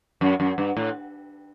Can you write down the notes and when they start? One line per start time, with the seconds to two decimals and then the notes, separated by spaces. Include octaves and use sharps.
0.21 F#2
0.40 F#2
0.58 G2
0.77 A2